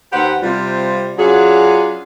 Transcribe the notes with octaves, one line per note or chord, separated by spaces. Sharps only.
D#2 G4 B4 C5 F#5
C3 G3 C4 F4
F#3 C#4 D4 F4 F#4 G#4